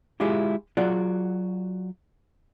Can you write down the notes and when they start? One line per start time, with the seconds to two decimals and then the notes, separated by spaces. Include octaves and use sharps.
0.20 G#3 E4 F4 G4 G#4
0.77 F#3 F4 F#4 G#4 D5